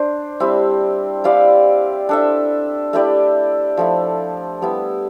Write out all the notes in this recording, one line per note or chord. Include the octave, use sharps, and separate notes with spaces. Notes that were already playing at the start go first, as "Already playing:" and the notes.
Already playing: D4 C5
G3 C4 E4
E4 G4 D5 F5
D4 A4 E5
A3 E4 G4 D5
F3 A3 E4
G3 B3 E4